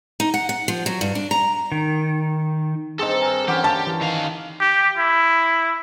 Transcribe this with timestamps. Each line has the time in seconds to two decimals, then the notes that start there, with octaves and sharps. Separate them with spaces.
0.20 D#4
0.34 F#5
0.49 F#5
0.68 F3
0.86 F#3
1.01 G2
1.15 D4
1.31 A#5
1.72 D#3
2.99 G2 C4 G#4 A4 D#5 A5 A#5
3.22 A#4 G#5
3.48 D3 E3 C#4 G4 F#5 D6
3.64 F5 A5
3.87 E3
4.01 D#3 F5
4.60 G4
4.98 E4